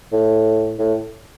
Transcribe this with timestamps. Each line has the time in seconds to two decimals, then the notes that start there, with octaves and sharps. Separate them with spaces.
0.12 A2
0.79 A2